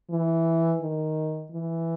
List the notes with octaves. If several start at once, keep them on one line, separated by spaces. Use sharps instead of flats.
E3
D#3
E3